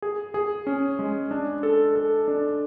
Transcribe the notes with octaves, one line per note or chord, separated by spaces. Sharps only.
G#4
G#4
C#4
G#3
D4
A4
A4
D4